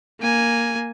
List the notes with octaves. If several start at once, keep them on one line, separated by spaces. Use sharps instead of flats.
A#3 G#5